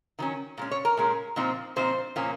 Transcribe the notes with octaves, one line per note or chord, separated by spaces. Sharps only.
D#3 F#3 C#4
A#2 G#3 C#4
C#5
A#4
A#2 G#3 C#4
A#2 F3 C4 D#4
A#2 F3 C4 D#4 C5
A#2 F3 A#3 C#4